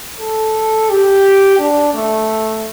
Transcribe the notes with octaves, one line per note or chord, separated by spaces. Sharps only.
A4
G4
D4
A3